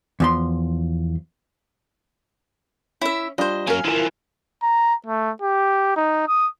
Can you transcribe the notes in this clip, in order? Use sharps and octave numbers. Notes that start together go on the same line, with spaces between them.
E2 F3 C6
C#4 E4 E5
G3 D4 F4 C5 D#5
F#3 A#3 C#4 A#4 F5 G#5
E3 F3 E4 A#4
A#5
A3
G4
D#4
D#6